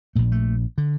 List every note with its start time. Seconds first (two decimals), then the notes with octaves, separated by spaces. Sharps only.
0.15 A#1 A#2 A3
0.32 A3
0.78 D3